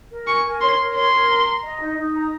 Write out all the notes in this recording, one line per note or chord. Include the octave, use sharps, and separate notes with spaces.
A#4
G#5 C#6
A#4
C#5 C6
A#4
C#5 C6
A#4
A#5
A#5
D#5
D#4
D#4
A#5